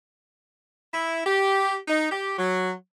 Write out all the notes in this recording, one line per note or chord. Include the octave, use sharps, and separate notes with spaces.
E4
G4
D#4
G4
F#3